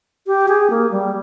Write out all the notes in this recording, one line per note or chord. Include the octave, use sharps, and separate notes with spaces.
G4
G#4
A#3
G3